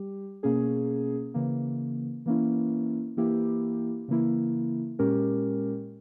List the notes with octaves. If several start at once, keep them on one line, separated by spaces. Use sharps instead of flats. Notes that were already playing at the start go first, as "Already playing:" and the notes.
Already playing: G3 G4
B2 A#3 C#4 G#4
C#3 E3 A#3
E3 A#3 C#4 E4
E3 A#3 E4 G4
C#3 E3 A#3 E4
A#2 G#3 C#4 G4 A#4